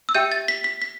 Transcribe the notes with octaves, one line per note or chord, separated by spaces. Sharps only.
E6
G4 E5 G5 G6
A6
B6
B6
B6